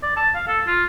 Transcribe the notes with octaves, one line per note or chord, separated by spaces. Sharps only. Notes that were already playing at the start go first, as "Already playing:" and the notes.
D5
A5
F5
A4
F4